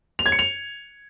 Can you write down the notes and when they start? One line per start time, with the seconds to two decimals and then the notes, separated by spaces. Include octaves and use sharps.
0.19 F7
0.26 G#6
0.32 C#7
0.39 F7